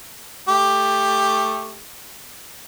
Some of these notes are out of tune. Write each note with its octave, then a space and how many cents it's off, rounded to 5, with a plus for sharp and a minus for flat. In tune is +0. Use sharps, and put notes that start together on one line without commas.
A3 +0 G4 +10